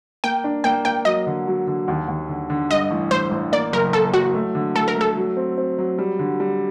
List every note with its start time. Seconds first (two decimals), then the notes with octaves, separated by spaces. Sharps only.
0.24 A#3 G5
0.44 D4
0.64 A#3 G5
0.85 A#3 G5
1.05 F#3 D#5
1.26 D3
1.47 F#3
1.67 D3
1.88 D#2
2.08 D#2
2.29 D3
2.50 D3
2.70 G2 D#5
2.91 A1
3.11 A1 C5
3.31 A1
3.52 A#3 D5
3.73 F#1 A#4
3.93 A#3 A4
4.14 F#3 F#4
4.34 A3
4.55 D3
4.76 A3 A4
4.88 A#4
4.95 A3
5.01 A4
5.17 F#3
5.37 C4
5.58 C4
5.78 F#3
5.98 G3
6.19 D3
6.40 G3